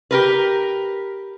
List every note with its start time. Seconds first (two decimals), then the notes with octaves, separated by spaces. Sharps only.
0.11 G4 A#4 B4